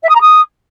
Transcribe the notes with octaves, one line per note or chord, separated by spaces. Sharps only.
E5
D#6
A#5
D#6